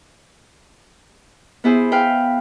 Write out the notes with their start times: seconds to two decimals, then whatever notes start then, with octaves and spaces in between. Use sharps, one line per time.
1.64 B3 E4 G#4 C5
1.92 B4 F5 G5